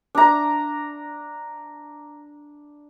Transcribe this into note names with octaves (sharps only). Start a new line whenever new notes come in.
D4 A#5